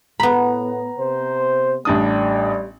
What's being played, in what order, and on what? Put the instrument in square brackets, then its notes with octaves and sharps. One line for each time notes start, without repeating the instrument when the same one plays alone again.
[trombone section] A2 [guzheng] B3 B5 [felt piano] A#5
[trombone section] C3 C5
[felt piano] A1 D4 D#6 [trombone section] G3